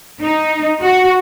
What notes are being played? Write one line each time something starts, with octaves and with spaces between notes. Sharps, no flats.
D#4
F#4